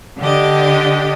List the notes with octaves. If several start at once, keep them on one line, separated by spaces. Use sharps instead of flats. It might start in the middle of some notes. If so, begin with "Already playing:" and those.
D3 D4 G4 D#5